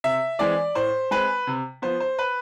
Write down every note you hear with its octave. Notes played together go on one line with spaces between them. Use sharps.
C3 E5
E3 G#3 C4 D5
A2 C5
G#3 C4 B4
C3
F3 B3 C5
C5
B4